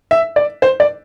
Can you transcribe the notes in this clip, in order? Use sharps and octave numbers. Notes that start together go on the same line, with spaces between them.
E5
D5
C5
D5